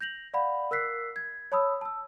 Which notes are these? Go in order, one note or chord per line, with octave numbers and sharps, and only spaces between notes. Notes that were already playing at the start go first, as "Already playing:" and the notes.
G6 A#6 F7 F#7
D5 F5 F#5 B5
A#4 E6 F#6 B6 C7
G#6
C#5 A5 B5 D#6 E6
A5 E6